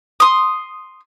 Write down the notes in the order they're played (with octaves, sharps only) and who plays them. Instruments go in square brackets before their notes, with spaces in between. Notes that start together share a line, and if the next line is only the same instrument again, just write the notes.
[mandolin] C6 D#6